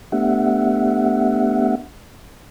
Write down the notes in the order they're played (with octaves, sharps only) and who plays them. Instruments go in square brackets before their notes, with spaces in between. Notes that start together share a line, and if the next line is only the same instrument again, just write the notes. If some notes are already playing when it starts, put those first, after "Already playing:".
[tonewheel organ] A3 B3 D4 G4 E5 F#5